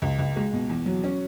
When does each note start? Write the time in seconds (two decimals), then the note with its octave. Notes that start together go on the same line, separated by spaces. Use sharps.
0.02 C#2
0.19 C#2
0.36 G#3
0.53 B2
0.69 E2
0.86 F#3
1.04 C#4